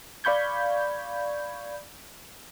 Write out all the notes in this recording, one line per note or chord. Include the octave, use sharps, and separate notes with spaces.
D5 F5 B5 C#6 G6 G#6